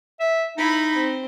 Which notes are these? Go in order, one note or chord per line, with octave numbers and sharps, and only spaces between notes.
E5
D#4 E4 B5
C4